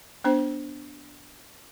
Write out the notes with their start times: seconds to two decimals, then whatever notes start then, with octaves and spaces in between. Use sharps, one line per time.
0.24 B3 D4 C5